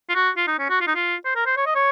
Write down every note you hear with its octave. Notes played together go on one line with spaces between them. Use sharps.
F4
F#4
F4
D#4
C#4
F#4
F4
D#4
F4
C5
A#4
C5
C#5
D#5
C#5